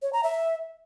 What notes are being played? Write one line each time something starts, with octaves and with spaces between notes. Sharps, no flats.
C#5
A#5
E5